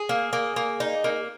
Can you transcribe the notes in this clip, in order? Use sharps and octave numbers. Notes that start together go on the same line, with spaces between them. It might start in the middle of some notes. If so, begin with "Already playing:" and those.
Already playing: G#4
A#3
A#3
A#3
D#4
A#3